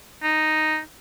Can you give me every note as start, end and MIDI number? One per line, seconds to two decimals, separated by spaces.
0.23 0.79 63